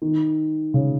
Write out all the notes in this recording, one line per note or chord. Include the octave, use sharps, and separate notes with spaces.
D#3
C#3